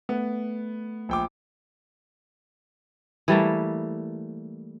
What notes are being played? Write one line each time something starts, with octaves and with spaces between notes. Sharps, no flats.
A3 B3
A#1 G5 D6
E3 G3 A3 A#3